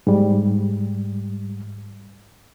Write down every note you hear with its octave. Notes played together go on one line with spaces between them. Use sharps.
G#2 G3